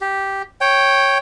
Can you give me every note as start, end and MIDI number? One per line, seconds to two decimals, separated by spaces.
0.01 0.42 67
0.61 1.18 73
0.61 1.18 79